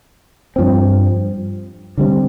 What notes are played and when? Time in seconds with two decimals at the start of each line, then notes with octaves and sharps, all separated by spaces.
0.56 G2 F3 C4
1.98 D3 G3 C4